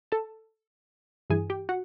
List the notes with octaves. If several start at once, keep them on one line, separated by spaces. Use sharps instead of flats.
A4 A5
G2 E3 G#4 G#5
G4 G5
F#4 F#5